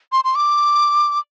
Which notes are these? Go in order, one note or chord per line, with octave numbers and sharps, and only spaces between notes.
C6
C6
D6